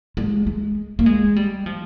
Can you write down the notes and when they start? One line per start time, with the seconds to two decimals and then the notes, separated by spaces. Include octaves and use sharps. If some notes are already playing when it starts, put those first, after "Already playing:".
0.17 G#3
0.47 G#3
0.99 A#3
1.06 G#3
1.36 G3
1.66 F3